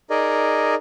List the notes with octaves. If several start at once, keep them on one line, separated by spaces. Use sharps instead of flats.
D#4 G#4 A#4 D5 D#5